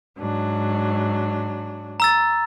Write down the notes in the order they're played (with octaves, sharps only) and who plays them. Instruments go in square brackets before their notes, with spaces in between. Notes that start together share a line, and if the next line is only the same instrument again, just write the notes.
[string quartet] G#2 F#3 D4
[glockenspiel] A#5 E6 A6